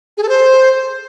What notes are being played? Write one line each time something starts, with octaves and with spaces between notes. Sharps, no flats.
G#4
A4
C5